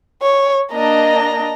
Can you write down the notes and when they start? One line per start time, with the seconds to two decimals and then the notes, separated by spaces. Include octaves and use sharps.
0.22 C#5
0.73 A#3 D4 D#5 A#5